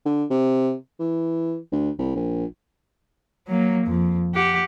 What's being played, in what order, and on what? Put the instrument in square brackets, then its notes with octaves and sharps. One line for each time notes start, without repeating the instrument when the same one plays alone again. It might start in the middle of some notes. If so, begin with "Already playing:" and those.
[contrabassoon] D3
C3
E3
D2
C2
A#1
[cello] F#3 A#3
F2
G4 F#5